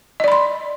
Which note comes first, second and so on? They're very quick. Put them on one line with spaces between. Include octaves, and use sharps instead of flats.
D#5 D5 B5 C6